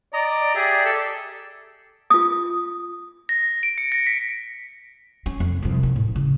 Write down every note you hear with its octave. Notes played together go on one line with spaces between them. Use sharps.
D5 D#5 A#5
G4 G#4 D5 E5
A4
F4 D#6
A#6
D7
C#7
A#6
B6
C#4
F2
C2 F3
C#4
A2
C#3